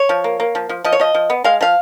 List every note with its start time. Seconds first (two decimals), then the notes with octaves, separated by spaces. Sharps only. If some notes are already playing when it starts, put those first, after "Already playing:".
Already playing: C#5
0.09 F3
0.24 A#3
0.40 A#3
0.55 F3
0.69 F3
0.85 F3 D#5
0.92 C#5
1.00 F3 D#5
1.15 F3
1.30 B3
1.44 G#3 F5
1.61 F3 F5